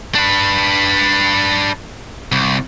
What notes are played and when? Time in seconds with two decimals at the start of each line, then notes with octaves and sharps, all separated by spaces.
0.15 D4 B4
2.32 C2